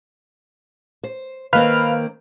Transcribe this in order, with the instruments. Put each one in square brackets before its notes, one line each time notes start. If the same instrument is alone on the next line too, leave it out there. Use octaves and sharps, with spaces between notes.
[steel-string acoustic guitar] C5
[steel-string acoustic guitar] D#3 A#3 C4 [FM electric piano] B4 F5 F6